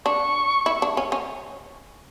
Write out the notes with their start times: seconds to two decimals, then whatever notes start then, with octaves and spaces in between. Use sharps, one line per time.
0.05 D4 C#6
0.66 E4
0.82 D4
0.97 C#4
1.12 C#4